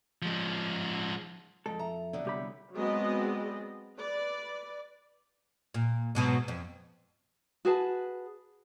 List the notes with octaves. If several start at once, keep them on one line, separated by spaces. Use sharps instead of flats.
F3 G#3
F2 G#3 A4
E5 A#5
D3 F#3 B3
C2 G4 B5
F#3 G#3 B3 C4 D5 D#5
B4 D5
A#2
G#2 B2 F#3
F2
F#4 G#4 B4 A5